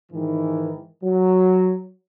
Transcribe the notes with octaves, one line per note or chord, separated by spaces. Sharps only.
G#2 D#3 E3
F#3